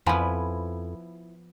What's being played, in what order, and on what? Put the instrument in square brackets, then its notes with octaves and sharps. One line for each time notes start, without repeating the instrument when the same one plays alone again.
[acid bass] F2 [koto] F3 B3 [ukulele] E4 G#5 B5